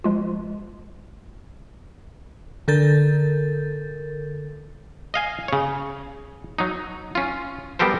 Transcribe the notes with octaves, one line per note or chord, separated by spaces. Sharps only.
F3 G#3 F4
D3 A4 A#4 G6 A6
D#5 F5 G#5
C#3 C#5
F#3 D#4
C#4 F4
G3 B3 G4 A4 A#4 C5